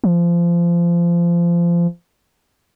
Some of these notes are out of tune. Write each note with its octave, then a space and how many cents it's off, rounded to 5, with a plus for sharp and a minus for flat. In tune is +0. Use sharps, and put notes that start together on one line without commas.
F3 -25